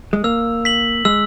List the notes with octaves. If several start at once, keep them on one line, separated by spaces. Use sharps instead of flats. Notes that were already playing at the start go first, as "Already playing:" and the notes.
G#3
A#3 E6
B6 F#7
G#3 E6